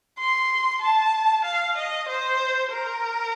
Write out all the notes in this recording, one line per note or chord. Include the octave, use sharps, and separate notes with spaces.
C6
A5
F5
D#5
C5
A#4